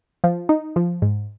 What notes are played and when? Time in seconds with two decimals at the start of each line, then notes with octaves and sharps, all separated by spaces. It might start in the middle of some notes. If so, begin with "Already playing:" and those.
0.24 F3
0.49 D#4
0.76 F3
1.02 G#2